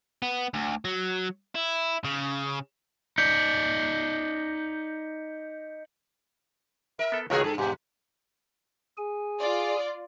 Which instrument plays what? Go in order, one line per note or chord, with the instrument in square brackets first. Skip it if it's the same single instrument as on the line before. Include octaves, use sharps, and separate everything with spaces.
[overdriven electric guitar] B3
D2
F#3
E4
C#3
[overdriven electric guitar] D#4 D5 [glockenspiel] G6 B6 C#7
[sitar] A#4 [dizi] E5
[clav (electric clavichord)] B3 A4
[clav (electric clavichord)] C#2 D#3 A3 [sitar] F4 F#4 G#4 [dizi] C#5
[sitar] G2 [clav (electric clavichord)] G#4 [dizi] A4
[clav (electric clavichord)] E2 G#2 [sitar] B2 [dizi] G4
[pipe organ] G#4 G#5
[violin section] F4 D5